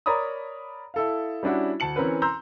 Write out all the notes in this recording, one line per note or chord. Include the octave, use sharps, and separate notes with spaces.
A#4 C#5 D5 A#5 B5 D#6
E4 A4 F5
G3 C#4 D4 E4 F#4
D2 A5 C#7 F#7
E3 C4 C#4 A#4 B4
A#5 C6 E6 G6